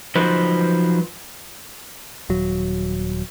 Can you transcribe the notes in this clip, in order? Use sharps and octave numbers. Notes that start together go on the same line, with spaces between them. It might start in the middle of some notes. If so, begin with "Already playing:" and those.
F3 F#3 D#4 B4 C5
D#1 F#3